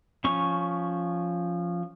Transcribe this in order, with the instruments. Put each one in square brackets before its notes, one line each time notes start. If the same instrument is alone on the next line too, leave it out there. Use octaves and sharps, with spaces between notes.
[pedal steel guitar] F3 C#4 C#6